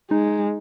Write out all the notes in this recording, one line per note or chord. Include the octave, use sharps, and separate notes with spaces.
G#3 D#4